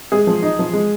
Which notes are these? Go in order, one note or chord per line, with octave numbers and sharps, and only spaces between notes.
G#3 G#4
F3
D#4
F3
G#3